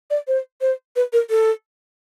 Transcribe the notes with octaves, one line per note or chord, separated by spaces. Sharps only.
D5
C5
C5
B4
A#4
A4